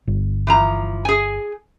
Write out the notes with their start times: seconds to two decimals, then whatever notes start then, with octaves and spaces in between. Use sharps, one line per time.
0.08 G1
0.47 E3 F3 A#5
1.05 G#4 G#5